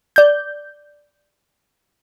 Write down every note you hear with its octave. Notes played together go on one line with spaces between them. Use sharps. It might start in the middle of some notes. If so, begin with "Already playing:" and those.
D5 G6